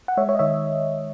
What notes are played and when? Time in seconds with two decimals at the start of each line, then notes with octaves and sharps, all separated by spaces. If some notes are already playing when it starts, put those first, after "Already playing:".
0.08 F#5
0.17 G#3 C#5 E5
0.29 C#5 E5
0.35 D#5
0.39 D#3 C#5 E5